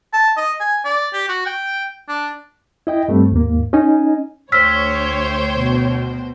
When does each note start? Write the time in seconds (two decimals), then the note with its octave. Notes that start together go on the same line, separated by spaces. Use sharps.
0.13 A5
0.37 D#5
0.60 G#5
0.85 D5
1.13 G4
1.29 F#4
1.46 G5
2.08 D4
2.87 E4 D#5 G5
3.08 G2 G3 A3 C4
3.32 D#2 G#2 A#3
3.73 C#4 D#4 D#5 G#5
4.52 D2 C5 C#5 G5 E6 F6 B6
5.54 B2